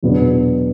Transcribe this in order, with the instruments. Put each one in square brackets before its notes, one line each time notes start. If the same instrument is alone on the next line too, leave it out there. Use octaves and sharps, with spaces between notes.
[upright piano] E2 B2 F#3 B3 D4